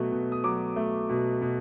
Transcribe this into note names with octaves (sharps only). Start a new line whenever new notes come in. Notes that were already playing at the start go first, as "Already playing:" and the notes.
Already playing: B2 F#3 A3
B2
D#6
F#3 D6
A3
B2
B2